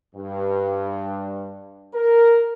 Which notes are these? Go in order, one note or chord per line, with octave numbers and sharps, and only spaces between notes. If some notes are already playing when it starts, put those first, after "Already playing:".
G2
A#4